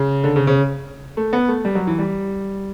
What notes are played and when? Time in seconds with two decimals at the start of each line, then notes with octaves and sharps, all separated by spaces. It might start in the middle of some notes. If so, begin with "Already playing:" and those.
Already playing: C#3
0.24 D3
0.36 C#3
0.47 C#3
1.17 A3
1.33 B3
1.48 A3
1.65 G3
1.75 F#3
1.87 E3
1.99 G3